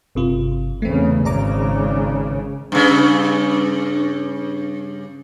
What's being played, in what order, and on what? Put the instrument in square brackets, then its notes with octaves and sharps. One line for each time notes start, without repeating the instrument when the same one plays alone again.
[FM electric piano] G1 C3 F4
[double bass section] E2 C#3 [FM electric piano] A3 C4
[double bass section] G#1 C#3 [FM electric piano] D5 A#5 D6
[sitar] G2 C#3